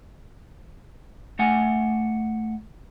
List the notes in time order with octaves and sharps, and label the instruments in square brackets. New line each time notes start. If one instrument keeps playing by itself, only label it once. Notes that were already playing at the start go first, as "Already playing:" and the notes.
[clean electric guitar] A3 F#5 G#5